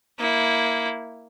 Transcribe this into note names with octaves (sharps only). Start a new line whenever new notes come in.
A#3 E4